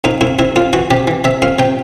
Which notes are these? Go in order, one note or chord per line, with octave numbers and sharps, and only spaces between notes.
F2 D#4
F2 E4
C3 E4
F2 F4
E3 F#4
C3 G4
E3
C3 E5
F2 F5
C3 G5